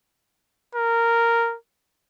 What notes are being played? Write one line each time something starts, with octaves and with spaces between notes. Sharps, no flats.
A#4